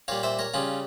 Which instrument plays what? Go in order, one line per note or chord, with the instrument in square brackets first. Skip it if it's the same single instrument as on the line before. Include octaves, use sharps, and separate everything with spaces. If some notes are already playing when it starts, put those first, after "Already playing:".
[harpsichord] A#2 G3 C#5 F5
C5 E5
A#4 C#5
C#3 G3 C#4 F4